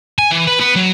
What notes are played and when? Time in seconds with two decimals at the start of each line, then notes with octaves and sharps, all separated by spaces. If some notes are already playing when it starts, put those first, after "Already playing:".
0.19 G#5
0.31 E3
0.47 B4
0.60 B3
0.76 F#3